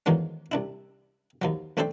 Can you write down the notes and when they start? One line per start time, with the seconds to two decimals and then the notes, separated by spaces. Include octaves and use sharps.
0.06 E2 A2 D#3 F3 F#3 G#3
0.52 C2 D4 E4
1.42 D#2 F3 F#3
1.77 B1 A3 C4 D4 A4 C5